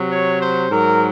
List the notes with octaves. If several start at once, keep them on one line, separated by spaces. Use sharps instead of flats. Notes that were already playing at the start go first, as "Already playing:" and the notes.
Already playing: C3 F#3
C#5
C5
G#2 F#3 A#4